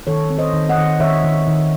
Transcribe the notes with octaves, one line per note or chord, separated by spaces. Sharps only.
D#3 A4 C#5
C4
C5 D#5
D#3
D#5 F#5
D#3
D#3 C#5 E5
D#3
D#3